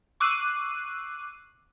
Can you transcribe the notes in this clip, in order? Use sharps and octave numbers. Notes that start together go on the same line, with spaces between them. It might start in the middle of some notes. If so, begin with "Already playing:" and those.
C#6 D6 E6 F#6 C7 D#7